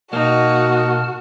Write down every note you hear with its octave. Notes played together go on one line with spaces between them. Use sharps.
B2 A#3 D#4 F#4 A5 F6